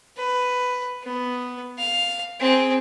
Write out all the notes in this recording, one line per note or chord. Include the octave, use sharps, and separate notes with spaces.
B4
B3
F5
C4 G#4